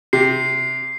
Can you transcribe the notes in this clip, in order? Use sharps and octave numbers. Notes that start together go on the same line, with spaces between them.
C3 C7